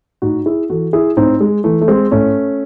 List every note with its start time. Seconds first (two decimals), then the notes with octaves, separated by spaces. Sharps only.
0.22 A2 D#4 F#4
0.46 E4 G#4
0.70 E3 F#4 A4
0.93 E4 G#4
1.16 A2 C4 D#4
1.40 G#3
1.64 E3 A3
1.81 A3
1.88 G#3 C4
2.11 A2 A3 C#4